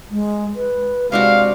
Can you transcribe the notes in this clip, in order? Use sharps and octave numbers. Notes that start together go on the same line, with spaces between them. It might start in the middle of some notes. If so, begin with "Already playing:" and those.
G#3
B4
C3 G#3 D4 F#4 F5